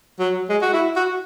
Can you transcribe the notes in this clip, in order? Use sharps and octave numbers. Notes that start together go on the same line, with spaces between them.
F#3
G#3
F#4
E4
F#4